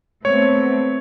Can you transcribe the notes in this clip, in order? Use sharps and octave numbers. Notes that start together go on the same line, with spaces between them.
A3 B3 C4 C#5